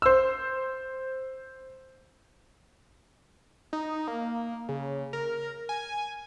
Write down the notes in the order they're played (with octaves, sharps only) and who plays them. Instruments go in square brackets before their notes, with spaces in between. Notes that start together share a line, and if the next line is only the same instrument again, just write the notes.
[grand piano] C5 E6
[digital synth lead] D#4
A#3
C#3
A#4
G#5